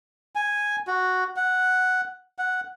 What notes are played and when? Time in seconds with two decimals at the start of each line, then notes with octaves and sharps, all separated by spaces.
0.35 G#5
0.87 F#4
1.36 F#5
2.38 F#5